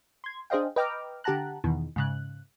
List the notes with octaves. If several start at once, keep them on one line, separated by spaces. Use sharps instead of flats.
C6 G#6
D4 G#4 C5 D#5 F5 G5
B4 D#5 G5 A#5 D6 F6
D3 G4 F#5 A5 A#5 F#6
E2 B2 D#3 E3
G#2 C#3 F#6